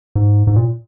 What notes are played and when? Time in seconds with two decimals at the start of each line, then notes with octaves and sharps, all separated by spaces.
0.15 G#2
0.47 G#2
0.56 A#2